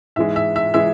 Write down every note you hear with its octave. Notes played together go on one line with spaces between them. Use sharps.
G#2 E3 G#3 E5
E5
E5
E3 G#3 E5